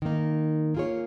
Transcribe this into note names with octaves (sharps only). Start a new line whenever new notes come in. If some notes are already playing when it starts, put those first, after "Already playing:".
D#3 A#3 D#4
A#3 F4 G#4 C#5